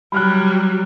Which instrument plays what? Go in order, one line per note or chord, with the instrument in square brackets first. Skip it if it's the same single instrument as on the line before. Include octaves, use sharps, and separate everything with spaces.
[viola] F#3 G3 [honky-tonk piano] B5 F6 F#6